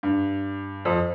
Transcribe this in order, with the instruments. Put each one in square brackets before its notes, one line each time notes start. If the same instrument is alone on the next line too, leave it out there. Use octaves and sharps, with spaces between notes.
[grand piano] G2
F2